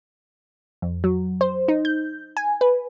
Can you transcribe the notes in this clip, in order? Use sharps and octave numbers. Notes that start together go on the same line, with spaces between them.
F2
F#3
C5
D#4
G6
G#5
B4